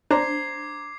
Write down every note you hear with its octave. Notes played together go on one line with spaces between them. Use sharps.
D4 C5 A#5 D6 G#6 C7